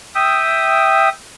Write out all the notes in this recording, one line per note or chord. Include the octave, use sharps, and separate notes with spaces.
E5 G5 D#6